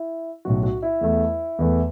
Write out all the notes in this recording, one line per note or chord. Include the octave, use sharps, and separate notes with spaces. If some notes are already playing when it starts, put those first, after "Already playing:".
Already playing: E4
B1 A2 F#3 F#4
F#4
E4
E2 E3 A3
E2 E3 A3